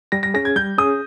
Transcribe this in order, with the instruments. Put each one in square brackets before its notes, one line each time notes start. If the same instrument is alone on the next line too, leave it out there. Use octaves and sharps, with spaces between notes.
[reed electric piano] G3 [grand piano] A#6
[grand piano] A#6
[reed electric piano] C#4 G#4 [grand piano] A#6
[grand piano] G#6
[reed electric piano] G3 [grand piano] G6
[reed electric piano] C#4 G#4 [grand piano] D#6